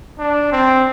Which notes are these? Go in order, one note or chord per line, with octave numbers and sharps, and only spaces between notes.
D4
C4